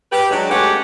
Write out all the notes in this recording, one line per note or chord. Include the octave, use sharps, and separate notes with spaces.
G4 B4
F#3 G#3 D4
G#3 A3 C#4 G4 B4 F#5